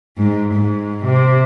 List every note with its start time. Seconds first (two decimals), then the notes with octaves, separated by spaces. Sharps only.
0.17 G#2
0.53 G#2
1.06 C3